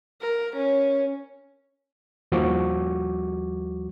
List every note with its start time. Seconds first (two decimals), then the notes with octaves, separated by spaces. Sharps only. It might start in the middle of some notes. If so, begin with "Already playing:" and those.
0.21 A#4
0.56 C#4
2.32 D#2 F3 G3 F#4 C#6 D6